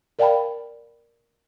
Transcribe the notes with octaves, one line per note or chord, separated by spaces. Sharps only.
A#4 D5 F5 G5 A5 B5